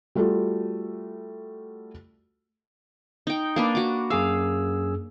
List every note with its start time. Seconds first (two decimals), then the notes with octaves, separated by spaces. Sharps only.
0.15 G3 A3 F4 F#4 A4
3.27 D#4 G5
3.56 A#3 D4 B4
3.75 F#4 D6
4.10 F#2 G#4 F5 E6